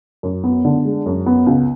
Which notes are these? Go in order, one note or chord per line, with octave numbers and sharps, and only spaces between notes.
F#2
B3
D3
G#3
F#2
B3
C#2